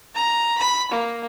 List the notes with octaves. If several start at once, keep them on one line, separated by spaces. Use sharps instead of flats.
A#5
B5
A#3